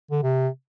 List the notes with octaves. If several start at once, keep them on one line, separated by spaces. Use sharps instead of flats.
D3
C3